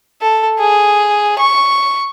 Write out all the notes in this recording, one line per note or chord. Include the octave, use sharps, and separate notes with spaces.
A4
G#4
C#6